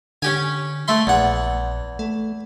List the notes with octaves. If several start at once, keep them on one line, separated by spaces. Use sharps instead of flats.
D3 C#4 G4 G#5
A3 E5 C6
A#1 E2 F#5
A3